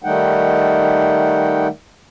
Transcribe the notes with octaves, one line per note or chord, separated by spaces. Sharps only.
D#3 G3 A3 D#4 F#5 G5